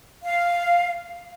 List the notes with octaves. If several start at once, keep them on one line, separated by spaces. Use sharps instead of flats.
F5